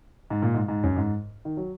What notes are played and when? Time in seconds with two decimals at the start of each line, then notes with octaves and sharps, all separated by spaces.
0.30 G#2
0.42 A#2
0.54 G#2
0.68 G#2
0.83 F#2
0.96 G#2
1.45 D#3
1.57 F#3